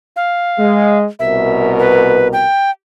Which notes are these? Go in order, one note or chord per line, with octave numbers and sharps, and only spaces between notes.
F5
G#3
C2 B2 A#4 E5
B4
G5